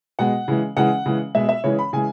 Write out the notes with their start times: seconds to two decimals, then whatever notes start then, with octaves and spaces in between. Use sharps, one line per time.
0.19 B2 G#3 F#5
0.48 C#3 E3 G#3
0.77 C#3 E3 G#3 F#5
1.06 C#3 E3 G#3
1.35 B2 G#3 E5
1.49 E5
1.64 C#3 E3 G#3 C#5
1.79 B5
1.93 C#3 E3 G#3 G#5